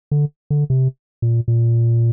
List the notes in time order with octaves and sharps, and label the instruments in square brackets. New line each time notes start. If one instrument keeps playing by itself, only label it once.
[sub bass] D3
D3
C3
A#2
A#2